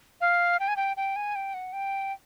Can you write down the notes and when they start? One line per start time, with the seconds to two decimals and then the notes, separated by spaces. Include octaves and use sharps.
0.21 F5
0.60 G5
0.68 G#5
0.77 G5
0.97 G5
1.16 G#5
1.35 G5
1.54 F#5
1.73 G5